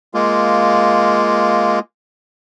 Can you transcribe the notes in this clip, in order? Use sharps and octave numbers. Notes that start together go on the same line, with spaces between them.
G#3 A#3 F4